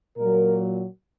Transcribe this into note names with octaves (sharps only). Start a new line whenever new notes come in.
A#2 F#3 A#4